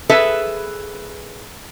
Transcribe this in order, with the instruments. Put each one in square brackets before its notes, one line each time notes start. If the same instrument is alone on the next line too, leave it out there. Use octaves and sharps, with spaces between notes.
[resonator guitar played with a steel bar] G#4 A4 B4 E5